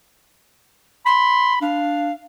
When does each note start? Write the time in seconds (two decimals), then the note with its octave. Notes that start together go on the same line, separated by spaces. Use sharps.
1.06 B5 C6
1.62 D4 F5